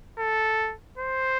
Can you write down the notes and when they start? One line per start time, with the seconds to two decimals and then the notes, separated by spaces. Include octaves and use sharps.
0.19 A4
0.98 C5